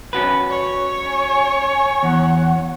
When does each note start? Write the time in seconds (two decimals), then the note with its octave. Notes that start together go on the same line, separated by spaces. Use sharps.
0.13 C#4 F#4 B4
0.50 C#5
1.06 G#5
2.03 E2 F#5